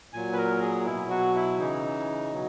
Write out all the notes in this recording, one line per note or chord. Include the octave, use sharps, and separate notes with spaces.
A#2 F#3 G#5
B4
A#4
G#4
B2 F#3 E4
F#4
E4
C#3 E3 D#4
B2 F#3